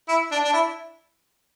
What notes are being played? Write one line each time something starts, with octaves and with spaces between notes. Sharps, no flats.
E4
D4
D4
E4